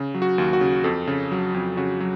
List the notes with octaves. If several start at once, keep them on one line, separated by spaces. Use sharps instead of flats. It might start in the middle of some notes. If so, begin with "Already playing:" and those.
Already playing: C#3
F#3
F#4
D#2
F#4
C#3
F2 A4
C#3
F#3
F2
C#3 F#4
F#3